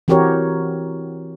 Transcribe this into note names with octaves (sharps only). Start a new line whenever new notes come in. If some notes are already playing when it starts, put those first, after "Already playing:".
E3 C4 F#4 G4 A#4 C#5